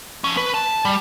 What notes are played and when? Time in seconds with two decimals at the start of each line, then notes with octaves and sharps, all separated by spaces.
0.24 F3 C#4
0.37 B4
0.54 A5
0.85 G3